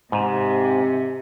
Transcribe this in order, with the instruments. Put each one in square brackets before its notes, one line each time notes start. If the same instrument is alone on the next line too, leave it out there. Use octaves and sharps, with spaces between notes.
[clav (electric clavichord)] G#2 [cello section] C3